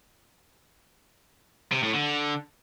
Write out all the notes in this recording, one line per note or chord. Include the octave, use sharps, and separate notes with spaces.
C3
A2
D3